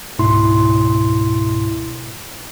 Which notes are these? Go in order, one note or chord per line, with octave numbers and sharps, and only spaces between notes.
C#2 G#2 B2 E4 C6